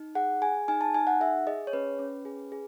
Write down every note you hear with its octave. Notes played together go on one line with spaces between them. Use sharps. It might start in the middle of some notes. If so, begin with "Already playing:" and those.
Already playing: D#4
G#4 F#5
G#4 G#5
D#4 G#5
A5
D#4 G#5
F#5
G#4 E5
G#4 D#5
C#5
C#4 B4
C#4
G#4
G#4